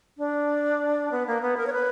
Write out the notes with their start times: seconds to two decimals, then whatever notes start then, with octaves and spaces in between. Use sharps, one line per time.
0.18 D4
1.11 B3
1.27 A#3
1.41 B3
1.57 A#4
1.67 C#5
1.73 B4